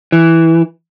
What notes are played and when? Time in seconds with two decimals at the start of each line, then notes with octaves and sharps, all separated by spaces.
0.12 E3